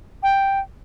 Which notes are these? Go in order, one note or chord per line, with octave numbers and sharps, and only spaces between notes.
G5